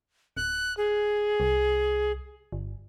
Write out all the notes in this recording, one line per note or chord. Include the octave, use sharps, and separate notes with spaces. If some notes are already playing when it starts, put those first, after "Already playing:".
D1 F#6
G#4
C2
G1